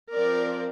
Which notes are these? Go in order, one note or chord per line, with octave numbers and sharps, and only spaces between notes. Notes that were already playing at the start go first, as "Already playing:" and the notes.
F3 C4 A#4 D5